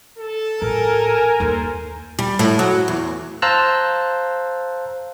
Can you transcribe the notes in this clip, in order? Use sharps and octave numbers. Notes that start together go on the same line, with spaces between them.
A4
A1 A#4 G#5
D#2 D#4 A4 C5
G3
A2
F#3
E2
C5 F5 A5 A#5 E6 F#6